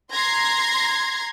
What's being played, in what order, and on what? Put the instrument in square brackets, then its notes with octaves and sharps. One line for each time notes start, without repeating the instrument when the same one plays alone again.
[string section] A#5 C6 G#6 A#6 C7